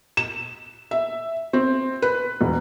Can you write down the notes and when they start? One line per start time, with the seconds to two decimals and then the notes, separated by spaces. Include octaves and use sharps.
0.17 E7
0.91 E5
1.53 C4
2.02 B4
2.41 E1